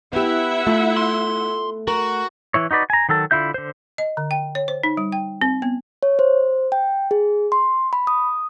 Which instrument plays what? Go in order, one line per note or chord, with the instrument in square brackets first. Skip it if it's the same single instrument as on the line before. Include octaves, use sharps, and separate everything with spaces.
[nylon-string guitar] B3 G4 [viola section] E4 E5 F#5
[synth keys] A3 [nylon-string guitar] F4
[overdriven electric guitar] C6
[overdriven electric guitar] F#4 [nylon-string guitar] A#4
[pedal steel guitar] E3 E4 C#5
D#4 F#4 B4 D5
G#5 A#5
D#3 F#3 A4 A5
D3 E4 F4 E5 G6
D3 C5
[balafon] D#5
D3
G5
C#5
C5
D#4
G3
G5
C4
B3
[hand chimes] C#5
C5
G5
G#4
C6
B5
D#6